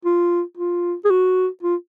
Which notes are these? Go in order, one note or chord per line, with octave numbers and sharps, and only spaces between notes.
F4
F4
G#4
F#4
F4